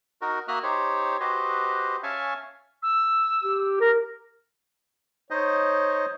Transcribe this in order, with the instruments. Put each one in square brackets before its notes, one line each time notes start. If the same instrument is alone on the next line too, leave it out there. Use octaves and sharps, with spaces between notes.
[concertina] D#4 F#4 A#4
A#3 F#4 E5 D#6 F6 F#6
D#4 G4 C5 C#5
F#4 G4 B4 C5 D#5
C#4 E5 F5 G#5 A5 C#6
[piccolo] E6
[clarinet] G4
A#4
[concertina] D#4 C5 D#5 [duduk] C#5